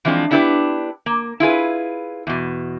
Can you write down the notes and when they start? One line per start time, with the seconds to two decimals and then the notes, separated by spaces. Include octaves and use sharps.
0.05 E3 F3 G#3 C4 D4
0.31 B3 D4 E4 G4 A4 B4
1.06 A#3
1.40 E4 F4 G#4 B4
2.27 E2 B2